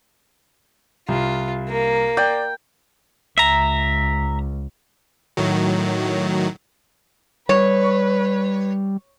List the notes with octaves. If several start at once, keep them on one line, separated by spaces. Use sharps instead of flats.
C2 F4
A#3
D5 G5
C#2 E5 A#5
A2 D#3 F#3
G3 B4 C#5